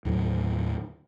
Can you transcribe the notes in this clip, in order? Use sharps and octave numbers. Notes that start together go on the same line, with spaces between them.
D#2 A2 D3 F#3